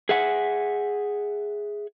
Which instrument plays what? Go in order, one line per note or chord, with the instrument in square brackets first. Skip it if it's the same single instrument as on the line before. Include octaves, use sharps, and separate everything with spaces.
[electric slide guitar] G#4 E5 F#5 G#5